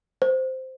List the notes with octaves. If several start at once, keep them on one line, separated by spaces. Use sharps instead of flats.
C5